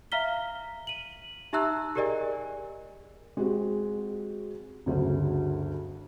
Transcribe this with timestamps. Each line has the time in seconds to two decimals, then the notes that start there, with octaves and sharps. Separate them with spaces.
0.12 E5 F5 A#5 F6 B6 G7
0.87 D#7 F#7
1.53 D#4 G4 E5 A#5 E6 F#6
1.95 G4 G#4 A#4 D5 D#5 G#5
3.37 G#3 C4 F#4 G4
4.86 G1 D2 C#3 F#3